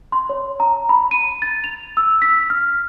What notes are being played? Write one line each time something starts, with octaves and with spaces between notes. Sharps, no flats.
C6
C#5
A#5
B5
D#7
A6
F7
E6
B6
F6